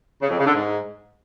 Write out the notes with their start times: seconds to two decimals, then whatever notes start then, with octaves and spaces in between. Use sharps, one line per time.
0.22 C#3
0.30 F2
0.38 C#3
0.45 D3
0.53 G#2